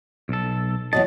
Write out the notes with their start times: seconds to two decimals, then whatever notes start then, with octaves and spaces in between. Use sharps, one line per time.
0.29 B1 A4
0.93 E2 F#3 D#5 A5